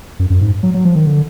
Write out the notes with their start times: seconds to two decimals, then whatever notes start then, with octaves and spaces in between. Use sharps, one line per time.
0.20 F#2
0.30 F#2
0.41 G#2
0.63 F#3
0.74 F#3
0.85 F3
0.96 D#3
1.06 D3